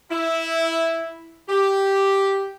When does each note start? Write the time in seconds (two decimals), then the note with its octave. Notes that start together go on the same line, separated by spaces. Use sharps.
0.10 E4
1.49 G4